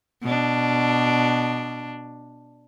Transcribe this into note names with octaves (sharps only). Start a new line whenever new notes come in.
B2 D4